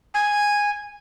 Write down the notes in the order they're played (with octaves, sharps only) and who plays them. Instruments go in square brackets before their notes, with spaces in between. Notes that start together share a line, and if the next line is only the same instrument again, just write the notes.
[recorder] G#5